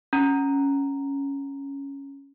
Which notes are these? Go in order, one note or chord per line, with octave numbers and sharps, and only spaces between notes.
C#4 A#5